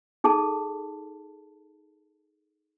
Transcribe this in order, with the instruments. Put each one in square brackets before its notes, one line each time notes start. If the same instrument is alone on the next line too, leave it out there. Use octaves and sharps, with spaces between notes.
[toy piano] D#4 G#4 A4 A5